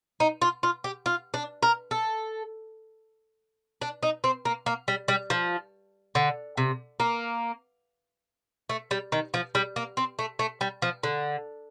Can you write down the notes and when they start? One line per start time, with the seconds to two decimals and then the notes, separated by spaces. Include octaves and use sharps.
0.20 D#4
0.41 F4
0.63 F4
0.84 G4
1.06 F4
1.34 D4
1.63 A#4
1.91 A4
3.81 D4
4.03 D#4
4.24 C4
4.45 A#3
4.66 A#3
4.88 G3
5.08 G3
5.30 F3
6.15 D3
6.57 C3
7.00 A#3
8.69 A3
8.91 G3
9.12 D#3
9.34 F3
9.55 G3
9.76 A#3
9.97 C4
10.19 A3
10.39 A3
10.61 G3
10.82 F3
11.03 D3